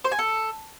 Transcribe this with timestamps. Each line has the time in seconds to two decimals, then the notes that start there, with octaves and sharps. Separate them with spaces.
0.04 C5
0.12 G#5
0.19 A4